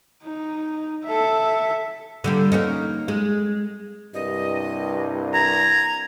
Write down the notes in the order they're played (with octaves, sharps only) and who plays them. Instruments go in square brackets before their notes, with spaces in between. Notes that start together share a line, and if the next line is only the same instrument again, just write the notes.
[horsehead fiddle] D#4
A4 E5
[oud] D3 G3 A#3
A#3 C#4 D#4
G#3
[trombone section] C2 G2 [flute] D#5
[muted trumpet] A#5 [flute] G#6